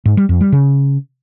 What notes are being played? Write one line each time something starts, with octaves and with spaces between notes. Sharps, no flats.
G#2
G3
F2
G3
C#3